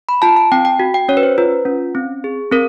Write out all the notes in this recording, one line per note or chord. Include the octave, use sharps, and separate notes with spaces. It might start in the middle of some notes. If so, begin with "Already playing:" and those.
B5
F4 A5
A5
C4 G5
G5
F#4
G5
C#4 C#5
B4
C5
F4 B4
C#4
C4
G#4
C4 A#4